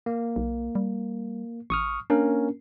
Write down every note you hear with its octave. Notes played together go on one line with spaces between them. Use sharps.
A#3
B1
G3
A1 C#6 D#6 F6
A#3 C#4 D4 A#4